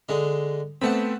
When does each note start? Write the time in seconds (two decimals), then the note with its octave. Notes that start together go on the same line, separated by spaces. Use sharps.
0.09 D3 G#3 D#4
0.81 A3 B3 C4 F#5 A5 B5